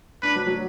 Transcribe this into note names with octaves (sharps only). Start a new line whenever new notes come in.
D4 B4
F#3
F#3